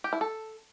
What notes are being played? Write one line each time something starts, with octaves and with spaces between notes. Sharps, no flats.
G4
E4
A4